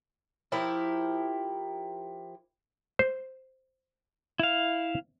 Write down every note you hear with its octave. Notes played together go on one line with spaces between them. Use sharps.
F3 E4 G4 A#4
C5
E4 F5